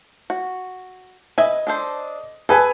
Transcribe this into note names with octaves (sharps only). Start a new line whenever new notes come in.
F#4
B4 D#5 E5 G#5
D4 A4 C5
G#4 A4 B4 G#5